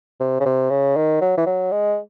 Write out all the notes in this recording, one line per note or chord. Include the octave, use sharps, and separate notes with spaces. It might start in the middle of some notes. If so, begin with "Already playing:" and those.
C3
C#3
C3
C#3
D#3
F#3
E3
F#3
G#3